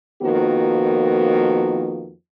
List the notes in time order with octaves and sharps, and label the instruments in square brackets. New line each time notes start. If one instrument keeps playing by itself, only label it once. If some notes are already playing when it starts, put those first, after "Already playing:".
[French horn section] F2 D#3 F3 A#3 B3 F#4